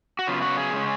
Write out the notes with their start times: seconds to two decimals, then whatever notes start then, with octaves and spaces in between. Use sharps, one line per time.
0.19 F#4
0.27 C#3 F#3 B3 F4
0.42 F#4
0.57 G#4
0.73 C#3 G#3 C#4